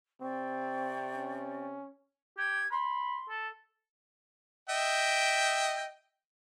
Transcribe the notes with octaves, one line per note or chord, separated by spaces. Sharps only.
C3 C4 D5 G5 C#6
C#4
G4 G#6
B5 C6
A4
D#5 E5 G5